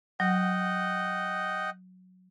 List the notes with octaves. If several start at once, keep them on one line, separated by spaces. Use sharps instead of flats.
F#3 D#5 F#5 G5